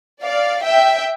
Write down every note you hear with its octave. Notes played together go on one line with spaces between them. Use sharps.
D5 F5
E5 G5